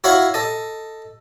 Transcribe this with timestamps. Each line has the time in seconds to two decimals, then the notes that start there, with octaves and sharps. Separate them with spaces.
0.04 E4 F#4 C#5 F5 F#5
0.34 A4 D#5